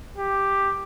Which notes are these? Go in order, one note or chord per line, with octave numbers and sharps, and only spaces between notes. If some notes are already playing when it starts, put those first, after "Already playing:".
G4